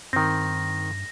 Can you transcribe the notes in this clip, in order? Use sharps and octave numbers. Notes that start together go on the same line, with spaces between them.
G2 D#3 C4 A#6